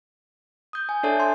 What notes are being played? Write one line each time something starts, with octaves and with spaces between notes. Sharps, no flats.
D#6 G6
G#5
D4 A4 C#5 D5 E5 A5
A5 C6